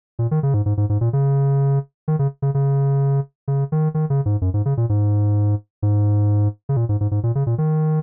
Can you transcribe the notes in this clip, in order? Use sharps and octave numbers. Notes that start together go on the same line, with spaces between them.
A#2
D#3
C#3
G#2
G#2
G#2
G#2
A#2
C#3
D#3
C#3
C#3
C#3
C#3
D#3
D#3
C#3
G#2
F#2
G#2
C#3
A#2
G#2
G#2
C#3
A#2
G#2
G#2
G#2
A#2
C#3
A#2
D#3